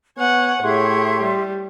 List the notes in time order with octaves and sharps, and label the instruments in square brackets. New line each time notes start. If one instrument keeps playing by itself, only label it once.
[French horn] B3 [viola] C#5 F#5 [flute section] G#5
[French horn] A2 [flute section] G4 E5 C6 [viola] G#4 C#5
[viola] G3